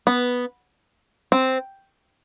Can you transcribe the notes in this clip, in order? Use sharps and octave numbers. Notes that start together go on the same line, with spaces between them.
B3
C4